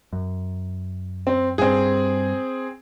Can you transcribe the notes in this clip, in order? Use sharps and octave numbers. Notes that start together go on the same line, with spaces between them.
F#2
C4
G2 C4 G#4